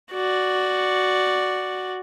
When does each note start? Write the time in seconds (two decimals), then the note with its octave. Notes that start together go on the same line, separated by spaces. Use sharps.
0.12 F#4 D5